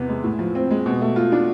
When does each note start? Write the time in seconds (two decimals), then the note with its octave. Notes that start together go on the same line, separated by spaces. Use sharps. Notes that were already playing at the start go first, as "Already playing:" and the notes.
Already playing: E2 C3 B3
0.09 G#3
0.23 A2
0.39 F3
0.55 C4
0.70 G#3
0.86 B2
1.01 A3
1.16 F4
1.32 D4